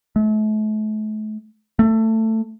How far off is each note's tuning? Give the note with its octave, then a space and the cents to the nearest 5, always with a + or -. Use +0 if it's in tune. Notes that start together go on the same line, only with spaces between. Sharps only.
A3 -40
A3 +15